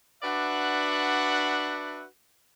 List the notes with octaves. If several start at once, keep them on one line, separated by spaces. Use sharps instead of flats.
D4 F#4 B4 D5 E5 F#5